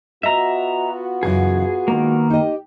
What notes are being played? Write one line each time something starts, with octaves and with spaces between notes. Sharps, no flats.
B3 F4 F#4 D#5 E5 A#5
F#2 C#3 E3 G#4
D#3 G#3 A#3
D#4 G4 D#5